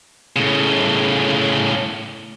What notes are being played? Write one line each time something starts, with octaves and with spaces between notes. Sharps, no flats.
A2 C#3